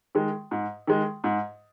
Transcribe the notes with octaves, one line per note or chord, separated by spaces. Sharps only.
D#3 G#3
G#2
D#3 G#3
G#2